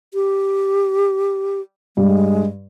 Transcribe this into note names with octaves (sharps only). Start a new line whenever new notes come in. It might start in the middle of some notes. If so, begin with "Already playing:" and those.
G4
G2 G#3